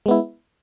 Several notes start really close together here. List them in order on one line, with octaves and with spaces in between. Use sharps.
G#3 B3 E4